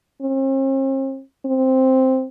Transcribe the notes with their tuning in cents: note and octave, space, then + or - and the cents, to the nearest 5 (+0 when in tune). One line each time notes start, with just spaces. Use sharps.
C4 +45
C4 +0